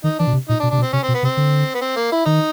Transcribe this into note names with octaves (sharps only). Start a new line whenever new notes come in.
D#3 D#4
E3 D4
B2
C3
A#2 D#4
D4
B2
C3 D4
B2
C4
C3 C#4
C4
B2
B3
C3 C4
D3
B3
C4
A#3
E4
D#3 D#4